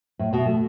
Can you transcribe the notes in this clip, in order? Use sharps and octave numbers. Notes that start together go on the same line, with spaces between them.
A2
B2
A3